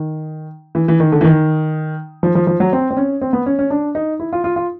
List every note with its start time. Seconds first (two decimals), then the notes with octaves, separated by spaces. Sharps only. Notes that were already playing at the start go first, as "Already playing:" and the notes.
Already playing: D#3
0.75 E3
0.88 E3
1.00 D#3
1.12 D3
1.21 E3
1.24 D#3
2.23 F3
2.35 F3
2.47 F3
2.60 F#3
2.73 C4
2.91 C4
2.97 C#4
3.21 C4
3.33 B3
3.46 C#4
3.59 C#4
3.70 D4
3.95 D#4
4.20 E4
4.33 F4
4.44 F4
4.56 F4